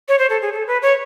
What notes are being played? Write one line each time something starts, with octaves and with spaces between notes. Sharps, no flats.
C#5
C5
A4
G#4
A4
B4
C#5